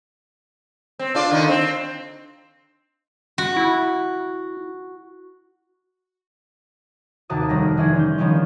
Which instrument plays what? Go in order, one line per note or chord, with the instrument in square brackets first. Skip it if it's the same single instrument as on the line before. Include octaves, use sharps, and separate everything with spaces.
[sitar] C4
D4 F4 D5
D3 D#3 D#4
C4
[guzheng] F#4
[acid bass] E4
[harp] D#2 C3 F#4 A5 D#6
F1 D#3 G3 A#6
D#3 E3 E4 G#4 C5
C#4 G6
D3 D#3 F3 G3 B3 C#4